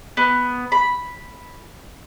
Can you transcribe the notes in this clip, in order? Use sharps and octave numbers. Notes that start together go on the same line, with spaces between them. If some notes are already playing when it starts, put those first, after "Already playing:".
B3
B5